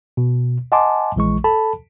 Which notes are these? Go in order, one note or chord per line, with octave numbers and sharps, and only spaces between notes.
B2
D#5 F#5 G#5 A5 C6 D6
A#1 E3 G#3 C#6
A4 A5 B5